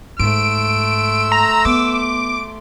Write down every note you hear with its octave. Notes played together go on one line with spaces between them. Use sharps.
G#2 A3 C6 E6 D7
A#5
B3 D6